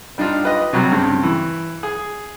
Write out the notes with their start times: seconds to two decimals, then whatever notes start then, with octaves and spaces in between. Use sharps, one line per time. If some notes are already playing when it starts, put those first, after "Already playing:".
0.18 G3 D4 D#4 F4
0.43 G4 B4 D#5
0.73 C3 F#3 G3
0.92 G2 C#3 C4
1.23 E3
1.83 G#4